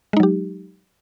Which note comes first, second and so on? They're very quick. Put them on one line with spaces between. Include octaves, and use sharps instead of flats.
G#3 D#4 F#3 G4